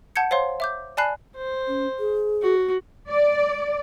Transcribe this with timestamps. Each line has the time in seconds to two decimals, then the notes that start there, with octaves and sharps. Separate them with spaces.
0.16 F#5 A5 G6 G#6 C#7
0.31 C5 C#5 F5 C6
0.60 E5 D6 G6
0.97 D5 G#5 A5 B5 F#6 C7
1.36 C5
1.67 C#4
1.99 G#4
2.42 F#4
3.10 D5